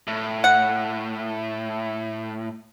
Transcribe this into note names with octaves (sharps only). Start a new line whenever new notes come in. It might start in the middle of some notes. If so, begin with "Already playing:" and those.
A2
F#5